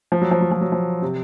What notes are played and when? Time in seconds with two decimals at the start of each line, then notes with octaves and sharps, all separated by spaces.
0.12 F3
0.22 F#3
0.31 F3
0.41 F#3
0.51 F3
0.61 F#3
0.72 F3
1.02 C3